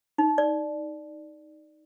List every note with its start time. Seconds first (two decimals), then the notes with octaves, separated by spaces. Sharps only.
0.18 D#4
0.38 D5